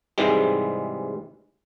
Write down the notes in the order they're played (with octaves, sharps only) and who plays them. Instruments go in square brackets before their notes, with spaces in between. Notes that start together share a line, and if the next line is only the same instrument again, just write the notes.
[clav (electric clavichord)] G#2 C3 E3 G3 G#3